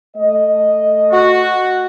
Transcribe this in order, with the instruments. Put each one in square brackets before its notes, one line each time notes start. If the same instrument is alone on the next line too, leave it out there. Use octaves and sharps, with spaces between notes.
[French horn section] A3 D#5
[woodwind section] F#4